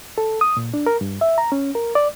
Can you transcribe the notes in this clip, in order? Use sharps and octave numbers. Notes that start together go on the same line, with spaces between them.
A4
D#6
A#2
D4
A#4
G2
E5
A#5
C#4
A#4
D5